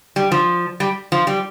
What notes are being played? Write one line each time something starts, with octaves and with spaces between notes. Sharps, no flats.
G3
F3
G3
F3
G3